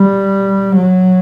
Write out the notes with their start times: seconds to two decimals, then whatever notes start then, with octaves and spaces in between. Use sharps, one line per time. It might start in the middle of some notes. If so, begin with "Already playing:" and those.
Already playing: G3
0.76 F#3